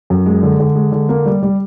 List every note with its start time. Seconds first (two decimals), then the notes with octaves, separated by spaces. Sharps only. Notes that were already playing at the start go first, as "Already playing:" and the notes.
0.10 F#2
0.26 G#3
0.43 D3
0.60 D3
0.75 G#3
0.92 D3
1.09 A#3
1.26 G3
1.43 G3